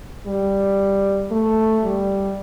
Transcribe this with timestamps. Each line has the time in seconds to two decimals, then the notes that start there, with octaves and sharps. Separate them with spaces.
0.27 G3
1.31 A3
1.83 G3